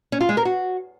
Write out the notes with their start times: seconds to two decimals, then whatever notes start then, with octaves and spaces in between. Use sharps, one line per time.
0.12 C#4
0.21 F4
0.29 G#3
0.37 A#4
0.45 F#4